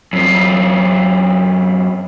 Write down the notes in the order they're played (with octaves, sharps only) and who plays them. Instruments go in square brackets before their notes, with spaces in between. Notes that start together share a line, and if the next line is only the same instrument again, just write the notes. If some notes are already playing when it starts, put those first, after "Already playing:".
[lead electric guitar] F#2 C4